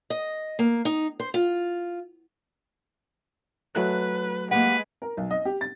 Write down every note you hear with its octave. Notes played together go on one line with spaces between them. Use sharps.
D#5
A#3
D#4
C5
F4
F#3 A3 B4 F#6
G#3 A#3 G4 B4 F#5
A#4
B1
D#5
G4
A6